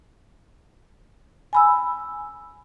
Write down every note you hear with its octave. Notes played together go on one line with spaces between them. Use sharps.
G#5 B5 E6